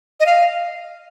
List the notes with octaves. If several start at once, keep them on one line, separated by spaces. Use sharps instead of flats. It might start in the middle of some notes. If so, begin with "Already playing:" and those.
D#5
F5